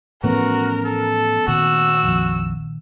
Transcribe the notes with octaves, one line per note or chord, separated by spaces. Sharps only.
A2 E3 F3 A3 B3 C#4 F#4 A#4
A4
A#2 D#3 F#4 E6
A#1 F2